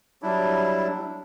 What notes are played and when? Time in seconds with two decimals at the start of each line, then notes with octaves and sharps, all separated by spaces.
0.22 F#3 G3 D4 E4